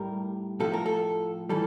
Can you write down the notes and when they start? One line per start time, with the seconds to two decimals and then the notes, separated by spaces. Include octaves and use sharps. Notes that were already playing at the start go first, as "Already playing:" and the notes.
Already playing: A2 G3 A#4
0.60 A2 F3 A4
0.73 A#4
0.86 A4
1.49 E3 G3 A4